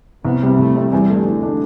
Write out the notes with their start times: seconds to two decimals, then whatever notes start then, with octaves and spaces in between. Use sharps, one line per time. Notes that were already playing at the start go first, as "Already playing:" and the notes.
0.25 C2 B3
0.42 C3 G3 C4
0.59 C2 A3
0.75 C3 G3 C4
0.92 E2 G3
1.09 D3 A3 D4
1.26 E2
1.43 D3 A3 D4